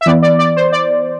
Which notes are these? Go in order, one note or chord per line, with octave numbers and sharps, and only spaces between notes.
E5
E3 B3 D5
D5
D5
C5
D5